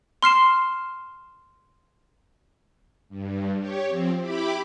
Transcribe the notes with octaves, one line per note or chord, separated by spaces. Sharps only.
C6 F6 C7 E7
G2
G4 C#5
F3 C4
E4 G4 B5 D6